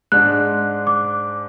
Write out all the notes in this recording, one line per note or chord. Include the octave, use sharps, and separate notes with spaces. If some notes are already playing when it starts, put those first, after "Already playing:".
G#2 G#3 D4 F#6
D6